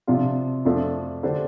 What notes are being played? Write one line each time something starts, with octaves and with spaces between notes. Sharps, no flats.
C3 F3 D4 F4
F2 F3 A3 D4 A4
D3 A3 D4 G4 C5